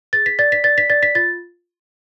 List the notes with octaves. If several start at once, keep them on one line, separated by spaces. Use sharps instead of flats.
G#4 A6
B6
D5 A6
B6
D5 A6
B6
D5 A6
B6
F4 A6